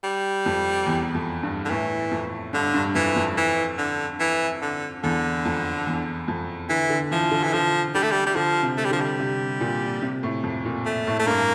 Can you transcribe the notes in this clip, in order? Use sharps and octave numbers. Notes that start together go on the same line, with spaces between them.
G3
F2
E2
F2
G2
D3
A2 E3
F2
G2 D3
G2
F2 E3
F2
E3
D3
E3
D3
E2 D3
F2
E2
F2
D3 E3
D3
E3 F3
D3
E3
D3 F3
D3 G3
A3
G3
G3
D3 F3
C3
A3
G3
D3 F3
G3
C3
A#2
C3
A2
F2
A#2
A3
A2
A3
G2 A#3